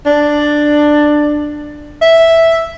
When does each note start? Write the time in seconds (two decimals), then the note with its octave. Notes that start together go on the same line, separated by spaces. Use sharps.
0.06 D4
2.02 E5